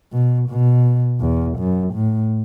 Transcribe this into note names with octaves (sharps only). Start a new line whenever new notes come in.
B2
B2
E2
F#2
A2